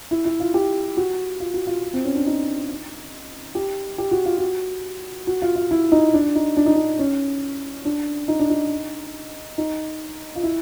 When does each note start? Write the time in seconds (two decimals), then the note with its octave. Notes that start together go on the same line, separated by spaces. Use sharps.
0.11 E4
0.25 E4
0.40 F4
0.54 G4
0.97 F#4
1.40 F4
1.54 F#4
1.67 F4
1.93 C4
2.05 C#4
2.15 D4
2.26 D#4
3.55 G4
3.98 G4
4.11 F#4
4.25 F4
4.38 F#4
5.27 F#4
5.42 F4
5.56 F4
5.71 E4
5.92 D#4
6.14 D4
6.35 D#4
6.57 D4
6.66 D#4
6.76 D4
6.99 C#4
7.85 D4
8.28 D#4
8.40 D4
8.50 D#4
9.58 D#4
10.35 F4
10.43 E4